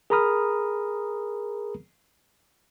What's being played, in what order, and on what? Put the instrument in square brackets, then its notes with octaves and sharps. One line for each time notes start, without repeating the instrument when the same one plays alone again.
[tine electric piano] G#4 A#4 A#5 B5 D#6 F6